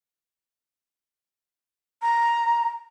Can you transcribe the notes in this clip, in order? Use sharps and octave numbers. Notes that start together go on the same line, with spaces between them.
A#5